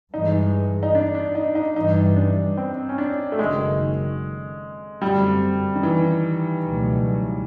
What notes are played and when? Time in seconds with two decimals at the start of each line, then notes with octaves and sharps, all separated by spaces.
0.13 G2 E3 G#3 D#4
0.83 D#4
0.95 D4
1.15 D4
1.35 D#4
1.55 D#4
1.76 G2 E3 G3 D#4
2.16 D4
2.57 C4
2.89 C#4
2.98 D4
3.32 A3
3.39 F#1 F#2 D#3 F#3 G#3
5.02 F#2 D3 F#3 G3 A3 C4
5.75 D#3
5.83 E3
6.65 C#2 B2 F#3 A3